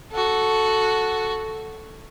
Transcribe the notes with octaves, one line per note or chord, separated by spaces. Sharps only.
F#4 A4